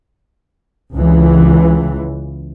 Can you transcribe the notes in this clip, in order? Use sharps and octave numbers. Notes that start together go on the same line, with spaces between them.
C#2 E3